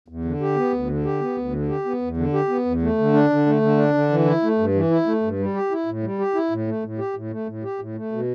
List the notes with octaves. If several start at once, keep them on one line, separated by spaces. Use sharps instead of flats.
E2
D3
G4
B3
D2
D3
G4
B3
D2
D3
G4
B3
E2
D3
G4
B3
E2
A3
D3
D4
D3
A3
D3
D4
D3
E3
E4
A3
G2
E3
E4
A3
G2
G3
G4
E4
A2
G3
G4
E4
A2
A3
A2
G4
A2
A3
A2
G4
A2
A3
B2